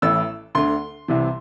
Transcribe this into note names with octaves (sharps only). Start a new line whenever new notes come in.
A1 A2 E3 E6
D2 D3 C6
C2 C3 E3